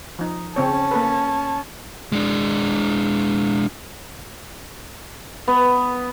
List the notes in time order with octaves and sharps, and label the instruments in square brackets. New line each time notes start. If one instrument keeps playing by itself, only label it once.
[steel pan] F3 D#4
[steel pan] C#3 C4 C#5 [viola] C#4 A5
[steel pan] A#3 A4 B4
[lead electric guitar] G#3 D4
[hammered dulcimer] B3